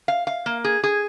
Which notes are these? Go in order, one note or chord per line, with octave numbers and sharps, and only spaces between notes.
F5
F5
A#3
G#4
G#4